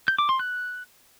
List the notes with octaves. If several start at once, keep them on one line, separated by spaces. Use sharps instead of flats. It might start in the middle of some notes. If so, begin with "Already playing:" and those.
G6
D6
C6
F#6